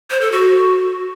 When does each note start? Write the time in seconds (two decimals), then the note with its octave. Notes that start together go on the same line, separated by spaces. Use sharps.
0.10 C5
0.21 A4
0.32 F#4